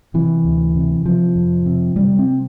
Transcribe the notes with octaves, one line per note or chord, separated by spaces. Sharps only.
C3 E3
D2
C3
C3 F3
F2
C3
C3 G3
C4